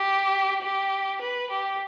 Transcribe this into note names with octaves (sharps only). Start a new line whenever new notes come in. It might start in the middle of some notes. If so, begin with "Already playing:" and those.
Already playing: G4
G4
B4
G4